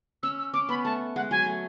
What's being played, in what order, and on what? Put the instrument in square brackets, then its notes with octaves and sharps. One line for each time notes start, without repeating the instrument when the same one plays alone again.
[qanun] C#4 [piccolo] E6
[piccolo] E6
[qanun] C#4 [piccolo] D6
[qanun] B3 [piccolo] B5
[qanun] A3 [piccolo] A5
[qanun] G#3 [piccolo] F#5
[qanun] F#3 [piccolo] G#5
[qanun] A3